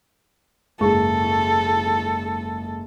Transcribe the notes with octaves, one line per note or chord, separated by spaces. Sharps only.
F#1 G#2 A4 C#6